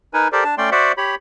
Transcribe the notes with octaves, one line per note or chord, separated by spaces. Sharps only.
D#4 A#4 B4 G#5
G4 A4 A#4 C5 D5
D4 A5
A3 C#4 D5 G5 C6
F#4 C5 D5 E5 F#5
G4 C#5 B5